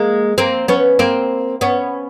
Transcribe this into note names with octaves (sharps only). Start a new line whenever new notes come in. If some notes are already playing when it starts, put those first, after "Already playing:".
Already playing: G#3 A#3
A#3 C4
B3 C#4
A#3 C4
B3 C#4